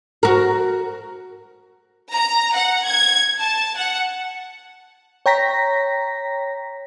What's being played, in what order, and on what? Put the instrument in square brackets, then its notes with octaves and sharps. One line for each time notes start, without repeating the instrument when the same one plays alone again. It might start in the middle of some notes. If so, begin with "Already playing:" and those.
[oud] F#4 A#4
[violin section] A#5
F#5
G#6
A5
F#5
[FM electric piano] C#5 G5 A#5 A#6 B6